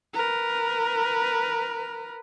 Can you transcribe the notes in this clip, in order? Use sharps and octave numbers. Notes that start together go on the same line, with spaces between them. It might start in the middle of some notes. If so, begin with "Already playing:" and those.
A#4 B4